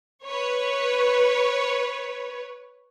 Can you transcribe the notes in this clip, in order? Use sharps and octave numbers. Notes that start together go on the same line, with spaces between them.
B4 C#5